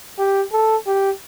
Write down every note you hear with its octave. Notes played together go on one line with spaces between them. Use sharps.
G4
A4
G4